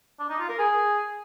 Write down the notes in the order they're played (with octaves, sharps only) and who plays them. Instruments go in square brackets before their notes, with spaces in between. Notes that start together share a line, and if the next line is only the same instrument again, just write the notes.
[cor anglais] D4
D#4
F4
A#4
G#4